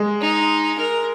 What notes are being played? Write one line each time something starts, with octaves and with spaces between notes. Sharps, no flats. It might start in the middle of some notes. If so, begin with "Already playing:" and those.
Already playing: G#3
D#4
A#4